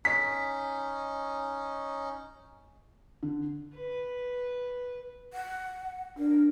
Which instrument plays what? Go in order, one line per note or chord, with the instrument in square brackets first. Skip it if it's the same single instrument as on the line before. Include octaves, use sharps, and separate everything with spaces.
[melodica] C#4 D#4 [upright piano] B6
[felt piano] D3
[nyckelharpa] B4
[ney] F#5
[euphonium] D4 [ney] A#4